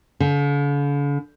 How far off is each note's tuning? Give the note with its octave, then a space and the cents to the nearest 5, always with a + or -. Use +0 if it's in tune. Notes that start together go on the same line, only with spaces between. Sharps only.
D3 -45